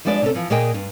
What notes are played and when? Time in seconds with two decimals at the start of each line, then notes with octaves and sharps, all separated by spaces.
0.05 F3 G3 G#3 D4 B4 D5
0.22 C3 C#4 A4
0.34 E3 F3
0.50 A#2 A#3 G#4 D#5 G5
0.74 G2